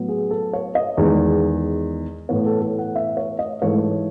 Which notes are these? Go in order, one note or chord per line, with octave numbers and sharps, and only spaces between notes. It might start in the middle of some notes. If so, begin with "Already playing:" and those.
Already playing: A2 F#3 B3
G#4
A4
C#5
D#5
E2 D#3 G#3
A2 E3 B3 C#5
A4
A4
F#5
E5
C#5
D#5
G#2 E3 A3 C#5